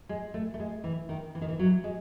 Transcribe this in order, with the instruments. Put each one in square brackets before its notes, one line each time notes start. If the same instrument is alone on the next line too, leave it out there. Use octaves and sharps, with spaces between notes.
[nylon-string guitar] G#3
A3
A3
G#3
E3
D#3
E3
D#3
E3
F#3
G#3